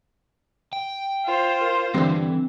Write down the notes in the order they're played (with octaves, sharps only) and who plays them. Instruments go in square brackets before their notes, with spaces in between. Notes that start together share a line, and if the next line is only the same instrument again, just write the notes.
[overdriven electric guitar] G5
[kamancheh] F4 C5
[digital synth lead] A#4
[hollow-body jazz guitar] G2 D3 [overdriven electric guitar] E3 [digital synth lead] C4